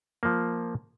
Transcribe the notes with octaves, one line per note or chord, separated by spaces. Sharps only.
F3 A#3